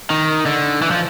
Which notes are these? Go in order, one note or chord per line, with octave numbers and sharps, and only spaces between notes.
D#3
D3
E3
F3